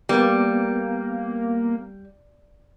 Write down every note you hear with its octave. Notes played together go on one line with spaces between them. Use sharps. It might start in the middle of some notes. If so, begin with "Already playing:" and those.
G3 A#3 B3